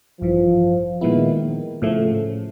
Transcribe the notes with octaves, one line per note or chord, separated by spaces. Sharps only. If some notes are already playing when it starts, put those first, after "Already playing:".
A1 G2 E3 F3
A#2 D#3 F3 G#3 B3 E4
A2 C#3 F3 A3